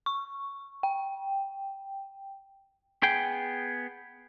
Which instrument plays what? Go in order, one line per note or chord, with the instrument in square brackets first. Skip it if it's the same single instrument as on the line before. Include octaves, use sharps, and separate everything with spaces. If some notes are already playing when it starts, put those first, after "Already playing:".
[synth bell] C#6
G5
[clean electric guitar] B3 G#4 G5